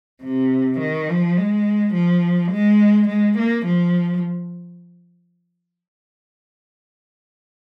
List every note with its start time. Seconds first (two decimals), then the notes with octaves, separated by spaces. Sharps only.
0.23 C3
0.80 D#3
1.09 F3
1.37 G#3
1.94 F3
2.52 G#3
3.08 G#3
3.38 A#3
3.66 F3